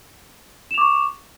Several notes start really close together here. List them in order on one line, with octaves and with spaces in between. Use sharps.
E7 F7 D6 C#6